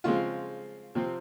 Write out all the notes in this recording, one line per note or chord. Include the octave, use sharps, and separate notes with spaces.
C#3 F3 G#3 C4 F4
C3 F3 C4